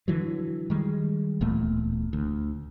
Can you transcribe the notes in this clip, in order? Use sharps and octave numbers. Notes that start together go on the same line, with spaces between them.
D3 E3 F#3
D#3 G3 G#3
D1 E2 A#2 A3
D2